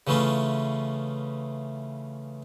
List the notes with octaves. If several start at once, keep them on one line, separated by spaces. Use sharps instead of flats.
C#3 E3 A3 C#4 F4